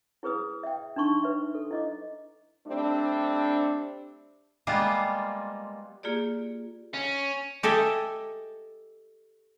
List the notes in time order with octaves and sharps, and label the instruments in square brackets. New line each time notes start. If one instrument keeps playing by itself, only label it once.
[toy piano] E4 G#4 B4 D#6
E5 G5
D4 D#4 C6 C#6
B4 E5
A4
E4 D#5 D6
[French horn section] G3 A3 C4 D4
[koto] G3 G#3 A#3 B3 F4
[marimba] A#3 F4 G4 G#4 D5
[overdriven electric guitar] C#4
[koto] G4 A4 D#5 E5 G#5